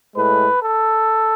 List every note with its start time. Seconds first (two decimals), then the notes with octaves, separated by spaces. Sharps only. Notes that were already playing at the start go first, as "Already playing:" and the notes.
0.15 A2 G#3 B4
0.62 A4